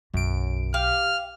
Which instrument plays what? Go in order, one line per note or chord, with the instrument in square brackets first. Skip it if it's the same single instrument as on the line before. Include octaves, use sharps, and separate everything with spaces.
[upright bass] B1 [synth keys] F#2 D7
[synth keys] G4 [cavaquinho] F5 [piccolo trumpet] F6